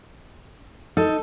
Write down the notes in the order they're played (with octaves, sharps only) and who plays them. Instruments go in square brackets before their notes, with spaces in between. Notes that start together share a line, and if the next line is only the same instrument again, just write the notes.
[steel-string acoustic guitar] D#4 [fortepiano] A4